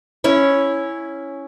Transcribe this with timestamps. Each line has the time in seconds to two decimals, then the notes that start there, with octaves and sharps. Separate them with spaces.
0.24 C#4 E4 C#5